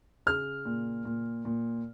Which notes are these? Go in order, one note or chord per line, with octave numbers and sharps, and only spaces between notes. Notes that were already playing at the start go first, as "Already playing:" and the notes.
C#3 F6
A#2
A#2
A#2